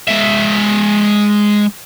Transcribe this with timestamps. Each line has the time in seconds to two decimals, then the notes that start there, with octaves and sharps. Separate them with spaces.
0.08 G#3 E5